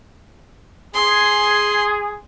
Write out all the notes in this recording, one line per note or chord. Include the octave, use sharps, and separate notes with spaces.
G#4 C6